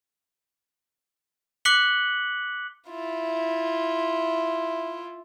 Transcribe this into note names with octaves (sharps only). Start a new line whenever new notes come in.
D6 F#6 B6 C#7 F#7 G7
E4 F4